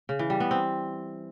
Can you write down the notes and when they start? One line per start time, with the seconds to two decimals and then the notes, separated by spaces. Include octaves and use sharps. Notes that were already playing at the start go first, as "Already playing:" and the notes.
0.09 C#3
0.19 E3
0.30 G3
0.40 B3
0.51 C4